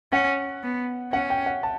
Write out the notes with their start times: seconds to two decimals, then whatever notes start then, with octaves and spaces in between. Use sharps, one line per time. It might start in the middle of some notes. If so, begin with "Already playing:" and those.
0.12 C#4 F#5
0.63 B3
1.12 C#4 F#5
1.30 G5
1.46 F#5
1.63 A5